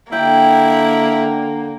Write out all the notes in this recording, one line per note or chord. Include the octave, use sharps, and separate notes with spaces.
D3 A#3 E4 G5